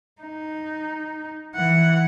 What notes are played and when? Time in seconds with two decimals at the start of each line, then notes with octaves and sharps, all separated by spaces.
0.22 D#4
1.55 E3 F#5